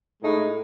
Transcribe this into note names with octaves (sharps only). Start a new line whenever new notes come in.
A2 G#3 D#4